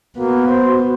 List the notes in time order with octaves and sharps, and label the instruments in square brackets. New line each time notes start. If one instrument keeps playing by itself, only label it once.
[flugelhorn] A#3 [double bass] B3 [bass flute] F#4
[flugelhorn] C5